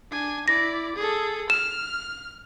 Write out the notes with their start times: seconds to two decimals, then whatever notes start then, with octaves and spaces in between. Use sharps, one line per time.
0.11 D4 G#5
0.48 E4 D5 A#6
0.96 G#4 A4
1.50 F6 E7